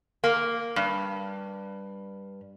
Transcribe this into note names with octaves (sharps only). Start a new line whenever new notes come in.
A#3
G2